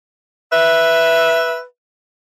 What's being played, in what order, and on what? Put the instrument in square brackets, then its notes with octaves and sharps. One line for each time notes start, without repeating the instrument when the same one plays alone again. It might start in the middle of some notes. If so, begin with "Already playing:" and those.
[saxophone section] B4 E5